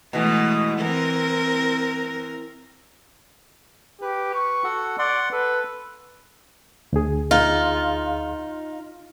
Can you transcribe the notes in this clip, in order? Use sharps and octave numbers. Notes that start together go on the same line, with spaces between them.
B2 E3 G#3 A3
E3 C4 A#4
G4 B4
C#6
F#4 A4 F#5
D5 F#5 C6
A4 B4
D2 G#4
D#4 F4